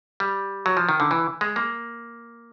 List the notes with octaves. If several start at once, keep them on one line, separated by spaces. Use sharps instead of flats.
G3
F#3
F3
D#3
D3
E3
G#3
A#3